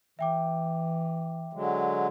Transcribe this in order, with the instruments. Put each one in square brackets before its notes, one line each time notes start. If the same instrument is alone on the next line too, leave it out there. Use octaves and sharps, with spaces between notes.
[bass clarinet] E3 [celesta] E5 G5 D6
[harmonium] D3 F#3 G#3